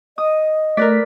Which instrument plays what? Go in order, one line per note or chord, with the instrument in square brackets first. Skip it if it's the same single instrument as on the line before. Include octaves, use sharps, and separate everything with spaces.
[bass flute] D#5 [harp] D#6
[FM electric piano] A3 B6 [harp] A#4 B4 D5